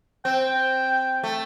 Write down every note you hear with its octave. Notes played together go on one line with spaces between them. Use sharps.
C4 G5
A3